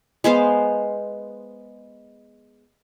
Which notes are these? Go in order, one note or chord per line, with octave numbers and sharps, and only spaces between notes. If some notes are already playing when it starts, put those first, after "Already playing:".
G#3 B3 C5 F5